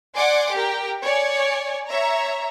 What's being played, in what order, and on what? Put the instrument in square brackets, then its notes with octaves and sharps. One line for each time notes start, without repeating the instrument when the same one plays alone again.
[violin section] D5 F#5 G#5 C6 D6
G4 A#4 G5
C#5 D5 G#5
C#5 E5 A#5